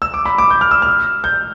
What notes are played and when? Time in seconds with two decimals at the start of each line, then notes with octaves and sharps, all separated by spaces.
0.02 E6
0.14 D6
0.26 B5
0.38 D6
0.50 G6
0.61 F6
0.71 E6
0.82 F6
1.24 G6